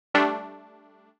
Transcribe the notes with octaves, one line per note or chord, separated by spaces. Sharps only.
G3 A3 D4